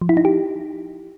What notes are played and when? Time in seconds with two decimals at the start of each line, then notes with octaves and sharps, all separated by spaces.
0.01 F3
0.09 E4
0.17 D#4
0.25 G4